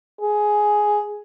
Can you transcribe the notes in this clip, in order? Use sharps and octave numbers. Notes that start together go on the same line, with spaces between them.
G#4